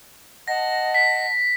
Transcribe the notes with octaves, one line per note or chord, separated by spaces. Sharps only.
D#5 F#5 A5 A#6
B6